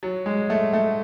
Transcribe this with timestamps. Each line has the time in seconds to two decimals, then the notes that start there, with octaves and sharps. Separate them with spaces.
0.03 F#3
0.26 G#3
0.50 A3
0.73 A3